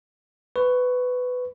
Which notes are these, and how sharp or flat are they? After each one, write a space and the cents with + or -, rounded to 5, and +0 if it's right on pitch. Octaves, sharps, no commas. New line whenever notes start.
B4 +15 C#6 +0